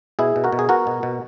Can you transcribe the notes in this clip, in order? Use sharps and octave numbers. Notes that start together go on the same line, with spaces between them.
B2 E4 G#4
B2
F#4 A#4
B2
G#4
B3 F#4 A#4
B2
B2